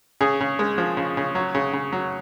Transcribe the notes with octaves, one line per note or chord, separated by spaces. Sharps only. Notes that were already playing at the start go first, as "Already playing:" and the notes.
C#3 G#4
C#3
G#3
F3
C#3
C#3
F#3
C#3
C#3
F#3